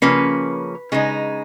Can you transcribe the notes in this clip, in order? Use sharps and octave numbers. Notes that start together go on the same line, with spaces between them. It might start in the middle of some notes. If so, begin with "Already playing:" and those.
C#3 F3 A#3 C#4 B4
C#3 G#3 D#4